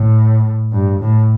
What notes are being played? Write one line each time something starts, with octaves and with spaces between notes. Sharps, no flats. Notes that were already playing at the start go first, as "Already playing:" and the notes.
Already playing: A2
G2
A2